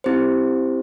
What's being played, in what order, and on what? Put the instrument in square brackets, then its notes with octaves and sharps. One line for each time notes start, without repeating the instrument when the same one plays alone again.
[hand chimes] C4 E4 G4 C5